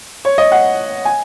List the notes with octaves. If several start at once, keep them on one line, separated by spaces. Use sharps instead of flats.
C#5
D#5
F#5
G#5